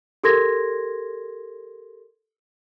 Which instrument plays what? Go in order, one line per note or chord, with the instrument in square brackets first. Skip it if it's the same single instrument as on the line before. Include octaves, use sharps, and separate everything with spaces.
[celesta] G4 A4 A#4 C6 G#6 A#6